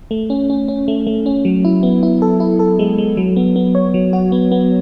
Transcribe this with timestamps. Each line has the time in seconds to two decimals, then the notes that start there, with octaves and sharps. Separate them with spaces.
0.11 A3
0.30 C#4
0.50 C#4
0.68 C#4
0.88 A3
1.07 A3
1.26 C#4
1.45 F#3
1.65 E4
1.83 B3
2.03 E4
2.22 A4
2.40 E4
2.59 A4
2.79 G#3
2.98 G#3
3.17 F#3
3.36 B3
3.56 B3
3.75 C#5
3.94 F#3
4.13 F#4
4.32 B3
4.52 B3